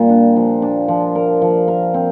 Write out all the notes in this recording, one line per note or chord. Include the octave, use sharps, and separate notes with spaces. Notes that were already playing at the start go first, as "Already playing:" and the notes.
Already playing: A#2 G3
D4
F3
D4
F3
A#4
F3
A#4
C4